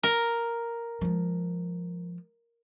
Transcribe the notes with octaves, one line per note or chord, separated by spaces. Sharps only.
A#4
F3 G#3